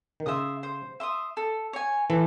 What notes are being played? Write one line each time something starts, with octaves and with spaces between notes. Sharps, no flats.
D#3
C#3 E5 C6 D#6
C5
E5 C6 D#6
A4
C#5 G#5
E3 A4